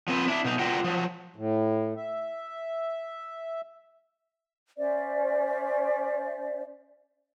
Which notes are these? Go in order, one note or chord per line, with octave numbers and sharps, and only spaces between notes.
F3 C4 B4
D4 E4
B2 D#4
D3 F4 F#4 B4 G5
F3 F#3
A2
E5
C#4 C5 D5 E5